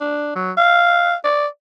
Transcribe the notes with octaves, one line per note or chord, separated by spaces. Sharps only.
D4
F#3
F5
D5